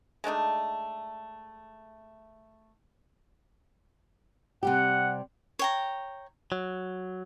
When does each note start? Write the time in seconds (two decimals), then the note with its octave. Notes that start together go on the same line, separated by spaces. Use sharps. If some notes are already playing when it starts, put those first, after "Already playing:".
0.24 G#3 A3 D4 D#4
4.63 C3 G3 G4 F#5
5.59 C#5 G5 A#5
6.52 F#3